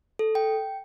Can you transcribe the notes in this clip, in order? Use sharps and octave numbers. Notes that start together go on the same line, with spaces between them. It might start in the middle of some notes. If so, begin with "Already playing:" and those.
A4
G5